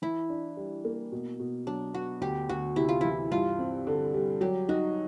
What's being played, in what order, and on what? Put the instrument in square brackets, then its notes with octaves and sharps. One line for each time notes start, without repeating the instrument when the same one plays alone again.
[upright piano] E3 [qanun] E4
[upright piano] D4
G3
A#3
B2
B2
[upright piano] F#3 [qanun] D4
[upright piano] B3 [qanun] F#4
[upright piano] D2 [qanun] G4
[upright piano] D2 [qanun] F#4
[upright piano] C3 [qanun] E4
[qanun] F4
[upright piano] E3 [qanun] E4
[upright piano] G2 [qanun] F4
[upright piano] C4
D3
G3
[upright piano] F#3 [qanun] G4
[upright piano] D#4 [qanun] F#4